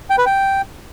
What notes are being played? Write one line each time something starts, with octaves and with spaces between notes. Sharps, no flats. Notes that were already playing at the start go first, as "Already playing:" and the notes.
G5
B4
G5